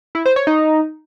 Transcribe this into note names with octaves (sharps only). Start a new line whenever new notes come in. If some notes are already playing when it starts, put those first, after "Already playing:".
E4
C5
C#5
D#4